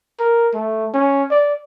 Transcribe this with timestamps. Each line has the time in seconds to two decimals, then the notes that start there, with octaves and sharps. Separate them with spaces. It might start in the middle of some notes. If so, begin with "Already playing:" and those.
0.19 A#4
0.54 A3
0.94 C#4
1.31 D5